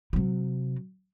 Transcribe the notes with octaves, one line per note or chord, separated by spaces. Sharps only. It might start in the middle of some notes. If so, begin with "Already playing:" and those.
C3 F#3